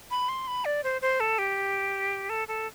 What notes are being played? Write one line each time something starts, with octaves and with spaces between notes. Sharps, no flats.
B5
C6
B5
D5
C5
C5
A4
G4
A4
A4